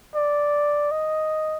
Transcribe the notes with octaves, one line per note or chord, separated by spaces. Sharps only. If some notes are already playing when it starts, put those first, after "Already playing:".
D5
D#5